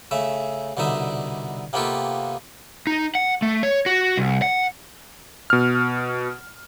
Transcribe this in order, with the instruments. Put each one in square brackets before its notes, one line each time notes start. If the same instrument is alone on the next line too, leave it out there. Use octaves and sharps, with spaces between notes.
[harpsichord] C#3 A3 E5
C2 B2 D3 D#4 E5
C3 A#3 B3 F4 G4 A4
[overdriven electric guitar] D#4
F#5
A3
C#5
F#4
C2
F#5
[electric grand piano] B2 F6